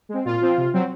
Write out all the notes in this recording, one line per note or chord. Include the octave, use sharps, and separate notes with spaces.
G#3 C4
A#2 F4
F3 C4
C3
F#3 C4